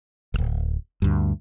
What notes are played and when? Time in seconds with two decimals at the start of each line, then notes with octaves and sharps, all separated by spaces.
0.34 D1 G#1
1.02 D2 G2